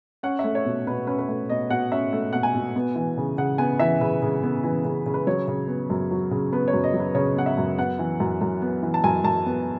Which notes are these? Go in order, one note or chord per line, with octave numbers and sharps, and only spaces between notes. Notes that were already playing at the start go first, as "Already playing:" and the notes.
C#4 F#5
E5
A3
C#5
B2
B2 B4
C#4 B4
B4
A3
B2 D#5
B2 F#5
C#4 E5
A3
B2 F#5
G#5
B2
B3
E3
C#3
C#3 F#5
B3 G#5
E3 E5
C#3 B4
C#3
B3
E3
C#3
C#3
B4
F#3 C#5
C#3
B3
F#2
F#3
C#3
B3 B4
C#5
F#2
D#5
F#3
B4
C#3 C#5
B3 F#5
E5
F#2
B3 F#5
E3
F#2
F#2
B3
E3
A5
F#2 G#5
F#2 A5
B3